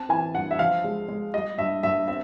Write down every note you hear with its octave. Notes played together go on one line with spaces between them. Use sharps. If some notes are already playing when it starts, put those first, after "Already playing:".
Already playing: C4 A5
E3 G#5
G2 F#5
E5
F3 F5
G#3
G#3
G3 D#5
G2 E5
G2 E5
C4 E5